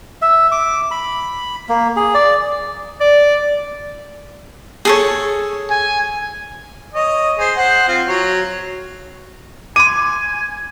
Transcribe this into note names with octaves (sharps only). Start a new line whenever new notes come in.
E5
D6
B5
A#3
G#4
D5
D5
G#4 A4 C#5
G#5
C#5 D#5
G#4 C5
C5 F#5
C4 F4
F#3 C#5
G#5 C6 D6 D#7